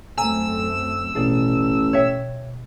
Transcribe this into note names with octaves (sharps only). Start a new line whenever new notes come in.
F#2 A3 C4 G#5 A#5 E6
A1 B2 G#4 D5
B2 C#5 E5 G5